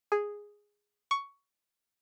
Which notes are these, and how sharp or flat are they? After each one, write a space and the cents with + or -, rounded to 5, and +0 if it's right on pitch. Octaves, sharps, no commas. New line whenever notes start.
G#4 -5
C#6 +10